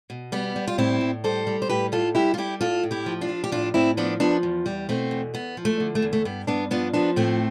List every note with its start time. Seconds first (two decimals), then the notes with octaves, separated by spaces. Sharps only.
0.10 B2
0.32 G3 B3
0.56 G3
0.68 F4
0.78 A2 C4 E4
1.01 A2
1.24 G3 A4 C5
1.47 G3
1.62 C5
1.69 A2 G4 B4
1.92 A2 F4 A4
2.15 G3 E4 G4
2.34 F4
2.37 G3 E4 G4
2.61 A2 F4 A4
2.83 A2
2.91 E4 G4
3.06 F3
3.21 D4 F4
3.29 F3
3.44 G4
3.52 A2 D4 F4
3.74 A2 C4 E4
3.97 F3 B3 D4
4.20 F3 B3 D4
4.43 E2
4.66 G3
4.89 B2 A3 C4
5.11 E2
5.34 E2 B3
5.57 F3
5.65 A3
5.80 D3
5.95 A3
6.02 E2
6.13 A3
6.25 G2 B3
6.47 G2 B3 D4
6.71 F3 B3 D4
6.93 F3 B3 D4
7.16 A2 A3 C4